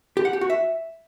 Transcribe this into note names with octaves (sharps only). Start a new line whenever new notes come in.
G4
F#5
G4
F#4
E5